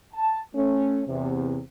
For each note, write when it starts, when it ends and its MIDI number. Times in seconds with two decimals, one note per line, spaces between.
0.14 0.39 81
0.55 1.02 57
0.55 1.02 61
1.08 1.58 40
1.08 1.58 48